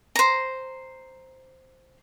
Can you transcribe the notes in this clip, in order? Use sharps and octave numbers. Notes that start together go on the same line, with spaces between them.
C5 A#5